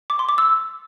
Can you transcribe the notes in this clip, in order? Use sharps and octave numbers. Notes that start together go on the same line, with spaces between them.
D6
C6
D6
E6